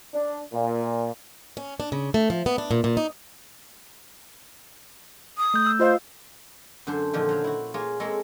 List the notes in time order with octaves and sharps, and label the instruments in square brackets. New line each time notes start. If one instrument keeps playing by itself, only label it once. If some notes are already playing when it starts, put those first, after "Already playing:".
[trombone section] D4
A#2
[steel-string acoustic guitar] C#4
D4
C#3
A3
F3
B3
D4
A#2
A#2
D#4
[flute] D#6
[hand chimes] A3 G6
E6
[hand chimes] F4 D#5 F5 [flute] C5
[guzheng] F#2 D3 D4 C5 C6
A#2 D3 D#3 F3
F#3 C5 F5
E4 F#4
A#3 F4 G#4 C#5
G#3 A#3 C4 A4 C#5